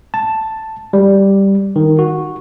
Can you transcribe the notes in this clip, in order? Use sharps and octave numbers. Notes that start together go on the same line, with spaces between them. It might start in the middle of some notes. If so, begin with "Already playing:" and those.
A5
G3
D#3
F#4